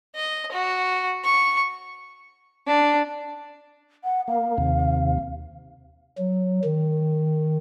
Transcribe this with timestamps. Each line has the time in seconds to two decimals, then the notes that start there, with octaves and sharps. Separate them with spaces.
0.15 D#5
0.52 F#4
1.24 C#6
2.67 D4
4.04 F#5
4.28 A#3 F5
4.58 D#2 C3
6.18 F#3
6.64 D#3